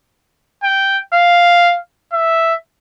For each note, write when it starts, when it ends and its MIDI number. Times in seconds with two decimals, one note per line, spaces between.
0.63 0.99 79
1.14 1.78 77
2.13 2.54 76